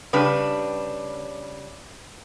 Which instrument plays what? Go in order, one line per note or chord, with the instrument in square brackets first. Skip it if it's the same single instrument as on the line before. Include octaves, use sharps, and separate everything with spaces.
[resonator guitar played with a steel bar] C#3 G3 D4 B4